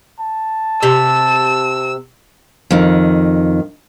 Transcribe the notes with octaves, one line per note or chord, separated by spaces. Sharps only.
A5
C3 E6
F2 D#3